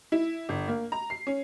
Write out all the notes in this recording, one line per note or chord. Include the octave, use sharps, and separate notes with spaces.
E4
G1
A#3
A#5
C7
C#4